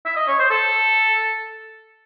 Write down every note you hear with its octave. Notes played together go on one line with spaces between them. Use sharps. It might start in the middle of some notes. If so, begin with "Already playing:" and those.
E5
D#5
C#5
C5
A4